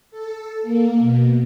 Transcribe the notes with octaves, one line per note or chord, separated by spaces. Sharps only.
A4
A#3
B2